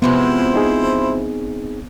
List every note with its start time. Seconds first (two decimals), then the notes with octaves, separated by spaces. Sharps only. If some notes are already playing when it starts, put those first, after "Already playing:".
0.02 C3 F3 G#3 B3 E4 C5
0.54 C4 D#4 G#4